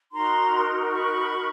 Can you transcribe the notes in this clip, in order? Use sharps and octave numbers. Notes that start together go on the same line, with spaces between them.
D#4 F#4 A#4 A#5 C6
B5 C#6